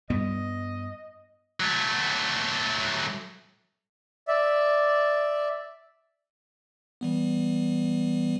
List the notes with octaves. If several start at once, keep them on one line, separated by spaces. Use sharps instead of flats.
G2 G3 B3 D#5
F#3 A3
D5 E5
E3 G3 B3